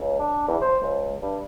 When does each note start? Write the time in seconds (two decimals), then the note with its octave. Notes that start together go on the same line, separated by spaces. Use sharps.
0.01 C#2
0.19 D4
0.48 E2
0.61 C5
0.82 C#2
1.22 G2